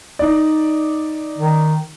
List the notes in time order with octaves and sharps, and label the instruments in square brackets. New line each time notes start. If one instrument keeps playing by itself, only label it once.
[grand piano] D#4 D5
[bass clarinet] D#3